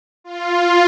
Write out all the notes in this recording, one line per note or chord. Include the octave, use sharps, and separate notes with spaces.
F4